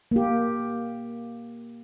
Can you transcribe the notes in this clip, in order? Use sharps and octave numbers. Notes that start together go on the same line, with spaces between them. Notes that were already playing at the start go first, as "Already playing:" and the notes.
A#3 G4